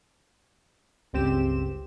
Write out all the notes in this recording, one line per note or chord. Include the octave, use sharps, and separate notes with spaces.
G1 C#2 C4 G4 E7